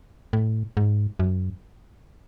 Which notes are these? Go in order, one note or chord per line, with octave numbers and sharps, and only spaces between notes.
A2
G#2
F#2